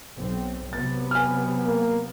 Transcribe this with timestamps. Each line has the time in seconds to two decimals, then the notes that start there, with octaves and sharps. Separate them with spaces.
0.17 B1 C4
0.73 C3 F#3 B3 A6
1.11 G#5 F6
1.65 A#3